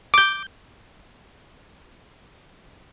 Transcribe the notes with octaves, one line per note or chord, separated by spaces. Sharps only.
D6 G6